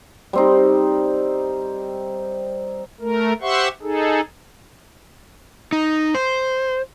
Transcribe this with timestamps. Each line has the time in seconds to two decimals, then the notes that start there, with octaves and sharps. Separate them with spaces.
0.33 G3 C4 D#4
3.00 A3 A#4
3.42 G4 C5 E5 F#5 C6 C#6
3.82 D#4 G#4 A4
5.73 D#4
6.14 C5